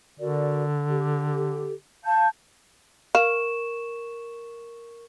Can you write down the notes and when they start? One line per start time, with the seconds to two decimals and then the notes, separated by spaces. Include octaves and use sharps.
0.20 D3 F#4 A#4 D5
0.90 G4 A4
2.05 F5 A5 G6
3.15 A#4 F5 C#6 E7